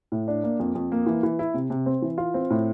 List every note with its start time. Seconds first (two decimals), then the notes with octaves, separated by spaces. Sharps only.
0.12 A2
0.28 D4
0.44 A#3
0.60 F2
0.75 F2
0.92 A#3
1.06 E3
1.23 E3
1.39 E4
1.54 C3
1.70 C3
1.86 C4
2.02 E3
2.18 F4
2.34 C4
2.50 A2